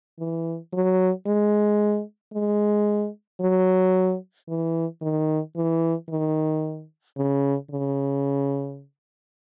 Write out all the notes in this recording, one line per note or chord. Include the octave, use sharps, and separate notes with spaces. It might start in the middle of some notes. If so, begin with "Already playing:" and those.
E3
F#3
G#3
G#3
F#3
E3
D#3
E3
D#3
C#3
C#3